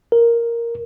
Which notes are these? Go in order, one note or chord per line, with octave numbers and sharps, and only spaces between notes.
A#4